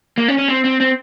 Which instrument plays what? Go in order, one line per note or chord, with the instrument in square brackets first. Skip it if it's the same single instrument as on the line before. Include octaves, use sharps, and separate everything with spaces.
[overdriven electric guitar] A#3
C#4
C#4
C4
C4
C4